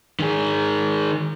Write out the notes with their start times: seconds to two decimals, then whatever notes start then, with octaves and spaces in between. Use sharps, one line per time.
0.20 D#3 G#4